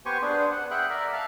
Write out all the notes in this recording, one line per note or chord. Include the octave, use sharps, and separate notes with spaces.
B3 G4 C5 G#5 C#6
B3 D4 G#4 C5
F#5
G#4 E5 F#5 G5 B5 F#6
A#4 D5 E5
E5 F5 A5